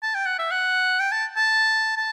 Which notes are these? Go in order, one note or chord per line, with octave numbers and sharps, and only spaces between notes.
A5
G5
F#5
E5
F#5
G5
A5
A5
A5